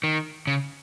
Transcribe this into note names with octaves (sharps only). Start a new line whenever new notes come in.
D#3
C#3